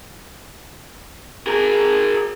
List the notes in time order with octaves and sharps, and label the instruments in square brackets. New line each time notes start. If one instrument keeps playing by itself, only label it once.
[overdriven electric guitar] G#4 A#4